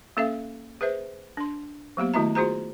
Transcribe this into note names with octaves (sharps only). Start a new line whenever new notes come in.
A#3 C#4 A4 E5 F5
G#4 B4 C5 E5
D4 C6
F#3 A#3 B3 G4
D#3 A3 E4 F#4 E5 A#5
F4 F#4 G#4 C5 A#5